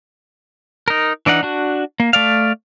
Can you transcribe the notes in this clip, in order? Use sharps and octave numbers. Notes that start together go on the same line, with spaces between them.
D#4 A#4
E3 D4 D#4 F#5
D4 F#4
A#3
A3 D5 F5